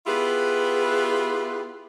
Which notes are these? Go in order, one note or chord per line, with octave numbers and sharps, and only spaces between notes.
B3 E4 F4 G4 G#4 B4